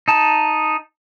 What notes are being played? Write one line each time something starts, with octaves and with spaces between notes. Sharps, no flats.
D#4 A5